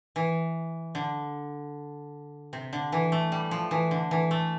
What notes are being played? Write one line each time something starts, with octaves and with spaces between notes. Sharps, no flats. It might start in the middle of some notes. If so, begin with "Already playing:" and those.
E3
D3
C3
D3
E3
A3
G3
F3
E3
D3
E3
A3